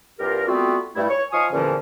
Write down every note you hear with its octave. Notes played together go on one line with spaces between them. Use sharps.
C2 G2 F4 G4 A#4
G3 A3 B3 C4 F4 F#4
G2 A3 E4
C#5 C#6
F3 D#4 F5 G#5 C#6 D#6
E2 A#2 D3 E3 F3 C#4